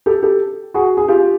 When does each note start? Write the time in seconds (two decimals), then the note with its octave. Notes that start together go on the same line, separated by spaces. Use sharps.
0.06 G4 A4
0.23 G4 A4
0.74 F#4 G#4
0.97 G#4
1.08 F4 G4